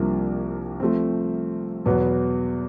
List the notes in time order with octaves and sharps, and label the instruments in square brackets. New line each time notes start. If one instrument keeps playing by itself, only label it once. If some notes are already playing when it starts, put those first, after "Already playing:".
Already playing: [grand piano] C2 C3 F3 A#3 D4
F3 A3 C4
E2 B2 F#3 B3